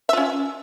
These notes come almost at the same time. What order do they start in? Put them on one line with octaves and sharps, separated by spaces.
E5 F4 C#4